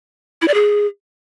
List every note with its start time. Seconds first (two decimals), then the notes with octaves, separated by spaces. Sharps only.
0.42 E4
0.48 D5
0.54 G#4